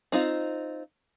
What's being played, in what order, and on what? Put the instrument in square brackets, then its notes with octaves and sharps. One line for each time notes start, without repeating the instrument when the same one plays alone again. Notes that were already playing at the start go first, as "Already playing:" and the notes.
[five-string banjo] C4 D#4 F4